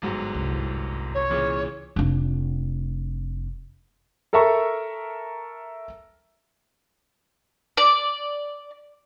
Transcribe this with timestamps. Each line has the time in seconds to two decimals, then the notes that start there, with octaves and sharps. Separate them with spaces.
0.02 G1 G#2 F#3
0.35 C2
1.14 C#5
1.30 A#2 C#3 E3
1.96 F1 D4
4.33 A4 A#4 E5 A#5 C#6
7.77 D5